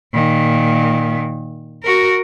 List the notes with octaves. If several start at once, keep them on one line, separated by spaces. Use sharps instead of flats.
A#2 D#3
F#4 A#4